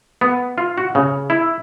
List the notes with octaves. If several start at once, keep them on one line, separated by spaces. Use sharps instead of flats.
B3
F4
F#4
C#3
E4